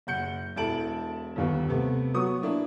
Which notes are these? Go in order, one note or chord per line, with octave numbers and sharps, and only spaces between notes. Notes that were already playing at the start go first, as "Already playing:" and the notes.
F#1 F#5 G6 C#7
E1 E4 A4 A5 D7 F#7
G1 D#2 B3
C3 A3 B3
F#3 B3 C#6 D#6
A#3 D4 E4